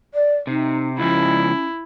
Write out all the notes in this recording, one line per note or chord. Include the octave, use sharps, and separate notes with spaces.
D5
C3 D#4
C#2 F3 C#4 E4